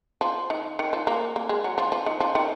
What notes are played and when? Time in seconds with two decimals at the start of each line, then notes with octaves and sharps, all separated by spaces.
0.21 F3
0.50 D#3
0.79 D#3
0.93 F3
1.07 A#3
1.36 A#3
1.49 G#3
1.64 F#3
1.78 F3
1.92 F3
2.06 D#3
2.20 F3
2.35 D#3